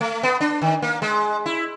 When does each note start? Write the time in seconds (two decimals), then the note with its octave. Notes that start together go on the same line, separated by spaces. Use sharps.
0.01 A3
0.23 B3
0.41 D4
0.62 D#3
0.82 A#3
1.02 G#3
1.46 E4